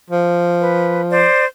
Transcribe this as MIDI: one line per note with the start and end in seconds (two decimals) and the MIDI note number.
0.10 1.26 53
0.60 1.01 71
1.10 1.44 72
1.10 1.44 74